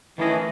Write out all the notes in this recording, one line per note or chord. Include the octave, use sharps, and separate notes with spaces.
D#3 E3 A3 C#4 G#4 D#5